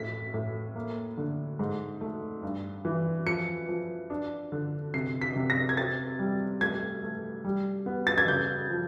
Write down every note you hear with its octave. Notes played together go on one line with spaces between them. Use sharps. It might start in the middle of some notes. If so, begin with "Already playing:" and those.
Already playing: A2 B6
A2
A#3
D3
G#2
A3
G2
E3
F3 C#7
F3
D4
D3
C3 C7
B6
C3
A#6
G#6
C4 A6
G3
A3 G#6
A3
G3
B3
A6
G#6
C#3 G6
F3